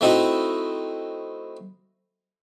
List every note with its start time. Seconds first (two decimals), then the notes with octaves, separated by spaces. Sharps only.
0.01 A3 C4 D#4 E4 F#4